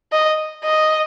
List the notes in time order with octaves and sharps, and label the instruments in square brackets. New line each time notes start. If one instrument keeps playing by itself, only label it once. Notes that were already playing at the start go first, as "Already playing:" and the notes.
[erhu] D#5
D#5